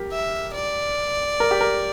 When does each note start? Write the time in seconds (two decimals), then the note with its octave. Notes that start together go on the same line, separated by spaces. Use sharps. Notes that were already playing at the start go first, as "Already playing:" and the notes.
Already playing: G4 A#4
0.12 E5
0.55 D5
1.40 A#4
1.51 G4
1.61 A#4